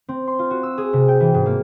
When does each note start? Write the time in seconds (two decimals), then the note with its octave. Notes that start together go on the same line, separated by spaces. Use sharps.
0.09 C4
0.27 C6
0.39 F4
0.50 F#4
0.63 E6
0.78 G#4
0.93 C3
1.08 G5
1.20 E3
1.34 G#2
1.46 A#3